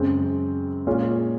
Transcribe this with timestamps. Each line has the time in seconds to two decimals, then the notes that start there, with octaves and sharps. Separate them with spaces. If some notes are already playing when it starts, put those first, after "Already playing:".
Already playing: F#2 C#3 G#3 C4
0.87 A#2 G#3 C#4 F4